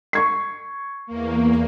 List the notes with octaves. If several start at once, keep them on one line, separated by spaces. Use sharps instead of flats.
C#6 G#6 C7
E2 A#3